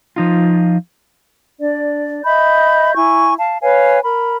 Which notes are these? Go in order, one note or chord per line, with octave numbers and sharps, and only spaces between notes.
F3 D#4 F4
D4 D5
D#5 E5 B5 G6
E4 G#5 C#6
F5 A5
B4 C#5 F5 G#5
A#4 B5